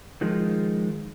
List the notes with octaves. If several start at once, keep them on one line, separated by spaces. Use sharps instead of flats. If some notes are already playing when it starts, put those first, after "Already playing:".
D#3 F3 G#3